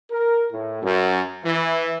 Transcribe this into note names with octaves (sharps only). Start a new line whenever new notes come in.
A#4
A2
F#2
E3